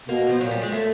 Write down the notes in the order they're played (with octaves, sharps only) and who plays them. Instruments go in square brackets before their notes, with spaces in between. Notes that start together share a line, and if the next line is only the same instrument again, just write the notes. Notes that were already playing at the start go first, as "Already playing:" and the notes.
[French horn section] B2 [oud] A#3
[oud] F3
[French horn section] A#2 [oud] F#3
[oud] G3
G#3
A3